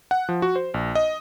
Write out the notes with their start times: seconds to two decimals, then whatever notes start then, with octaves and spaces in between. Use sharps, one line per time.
0.11 F#5
0.29 F3
0.42 F#4
0.56 C5
0.74 A#1
0.95 D#5